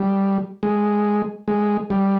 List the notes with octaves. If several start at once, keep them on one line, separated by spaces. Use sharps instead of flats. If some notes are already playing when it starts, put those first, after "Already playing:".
Already playing: G3
G#3
G#3
G3